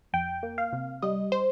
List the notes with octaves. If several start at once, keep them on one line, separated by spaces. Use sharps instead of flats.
F2 G5
A#3
F5
C3
G3 D#5
C5